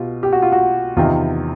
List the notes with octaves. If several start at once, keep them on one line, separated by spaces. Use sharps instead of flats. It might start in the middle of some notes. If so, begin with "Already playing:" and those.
Already playing: B2 F4 G4
G4
F#4
F4
F#4
E2 C3 D#3 F4